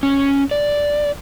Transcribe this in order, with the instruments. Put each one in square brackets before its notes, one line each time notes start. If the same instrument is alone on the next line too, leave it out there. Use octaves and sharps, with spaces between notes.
[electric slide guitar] C#4
D5